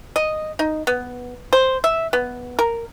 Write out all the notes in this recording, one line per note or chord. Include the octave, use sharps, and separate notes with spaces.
D#5
D#4
B3
C5
E5
B3
A#4